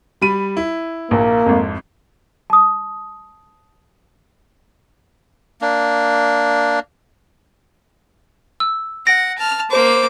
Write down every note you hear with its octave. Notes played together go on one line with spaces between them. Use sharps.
G3 B5 D#7
E4
A#1 A#3
G#1 F2
A5 D#6
A#3 D4
E6
F#5 A#6 D7
A5 F6
A#3 C5 D6